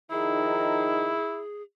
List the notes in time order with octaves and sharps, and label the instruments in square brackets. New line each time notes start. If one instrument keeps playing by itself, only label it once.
[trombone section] D#3 F3 D#4 [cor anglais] E4 [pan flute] G#4